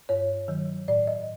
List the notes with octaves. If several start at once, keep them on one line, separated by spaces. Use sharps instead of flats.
G2 C#5
D#3 F#3
A2 D5
D#5